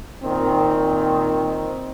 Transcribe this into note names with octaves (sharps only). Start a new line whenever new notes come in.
A#2 D#3 C4